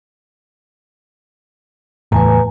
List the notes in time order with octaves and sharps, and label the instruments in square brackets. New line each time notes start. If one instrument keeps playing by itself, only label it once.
[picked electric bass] E2 A2 [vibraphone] B4 G#5 A#5